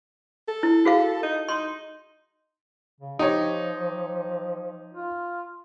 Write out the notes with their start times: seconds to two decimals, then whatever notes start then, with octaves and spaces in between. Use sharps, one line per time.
0.48 A4
0.63 E4
0.85 F#4 G#4 F5
1.23 D#4
1.49 D#4 C6
3.01 C#3
3.19 F3 D#4 G4 C#5
4.94 F4